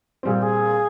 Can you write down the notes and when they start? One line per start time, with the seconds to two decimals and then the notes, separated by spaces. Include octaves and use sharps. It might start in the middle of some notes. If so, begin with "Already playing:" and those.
0.23 A#2 G3 C4 G#4
0.32 G4
0.41 G#4